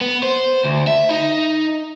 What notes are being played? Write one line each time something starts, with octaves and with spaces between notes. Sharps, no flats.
B3
C5
D2
E5
D#4